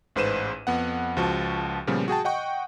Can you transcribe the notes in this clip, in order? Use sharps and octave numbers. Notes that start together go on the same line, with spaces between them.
A1 G#2 B4 C5 D#7 E7
F2 B3 F#5
C#2 F3 F#4 A5
A#2 C#3 F3 G3 B3
F#4 G#4 G5 A5
D#5 F#5 G5 C#6